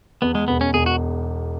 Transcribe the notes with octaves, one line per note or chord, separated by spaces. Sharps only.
E2 B3
G#3
E1 B3
C#4
E1 G#4
F#4